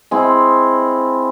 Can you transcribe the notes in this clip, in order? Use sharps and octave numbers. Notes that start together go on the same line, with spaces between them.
G#3 C4 E4